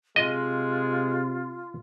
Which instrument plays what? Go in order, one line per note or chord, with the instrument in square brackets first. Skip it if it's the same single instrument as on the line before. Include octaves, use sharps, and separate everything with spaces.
[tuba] C3 [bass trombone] G#3 [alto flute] F4 [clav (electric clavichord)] D#5